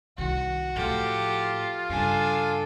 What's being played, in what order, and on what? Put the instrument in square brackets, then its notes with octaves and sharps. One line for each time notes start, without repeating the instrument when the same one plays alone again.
[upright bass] C2 D#3 [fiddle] F#4
[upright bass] A2 F3 [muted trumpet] F4 [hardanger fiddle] G4 A4
[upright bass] G2 C#3 [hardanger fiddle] D4 A4 [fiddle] G#5